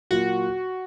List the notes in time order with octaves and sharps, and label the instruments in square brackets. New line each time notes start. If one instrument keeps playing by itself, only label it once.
[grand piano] A#2 F#3 A#3 F4 [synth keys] F#4